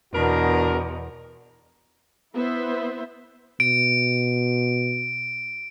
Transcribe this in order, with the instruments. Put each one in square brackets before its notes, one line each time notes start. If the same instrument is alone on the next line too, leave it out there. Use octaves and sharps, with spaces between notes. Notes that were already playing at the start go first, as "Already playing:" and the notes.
[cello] E2 B2 [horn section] D4 F#4 A#4
[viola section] B3 E4 B4 C5 E5
[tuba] B2 [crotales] D7